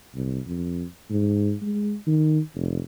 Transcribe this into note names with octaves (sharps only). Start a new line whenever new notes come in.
C2
F2
G#2
G#3
D#3
F1